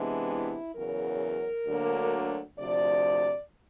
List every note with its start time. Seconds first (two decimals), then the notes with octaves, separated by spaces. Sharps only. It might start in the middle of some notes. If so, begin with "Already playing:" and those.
Already playing: C3 E3 G#3 B3 D4
0.29 E4
0.75 E2 C#3 F#3 A#4
1.67 D2 D3 F#3 A#3
2.57 D2 C3 F3 D5